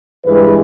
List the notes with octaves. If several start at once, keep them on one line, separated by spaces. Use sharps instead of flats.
G2 E3 G#3 B4